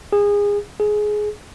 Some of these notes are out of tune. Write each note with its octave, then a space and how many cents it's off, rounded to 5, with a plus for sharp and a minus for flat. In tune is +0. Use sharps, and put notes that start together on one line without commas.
G#4 -25
G#4 +15